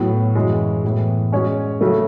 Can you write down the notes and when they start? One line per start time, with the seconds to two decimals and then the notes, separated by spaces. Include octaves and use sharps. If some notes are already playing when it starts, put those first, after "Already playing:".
Already playing: A2 F#3 B3
0.35 F#2 C#3 E3 G#3
0.84 A2 E3 B3
1.32 G#3 C#4 F#4 C#5
1.81 C#3 F#3 A3